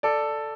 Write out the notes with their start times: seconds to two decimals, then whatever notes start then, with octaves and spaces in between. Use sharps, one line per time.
0.03 A4 D5